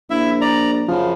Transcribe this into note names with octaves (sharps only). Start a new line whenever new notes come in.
A#1 E4 E5
D5 A#5
F#2 C#3 F3